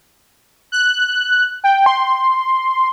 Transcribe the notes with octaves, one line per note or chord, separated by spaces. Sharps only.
F#6
G5
C6